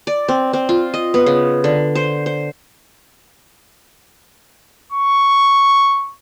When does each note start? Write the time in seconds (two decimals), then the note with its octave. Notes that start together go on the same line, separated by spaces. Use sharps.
0.07 D5
0.28 C4
0.53 C4
0.69 F4
0.94 D#5
1.14 B3
1.26 C#3
1.64 D3
1.95 C5
2.26 C5
4.92 C#6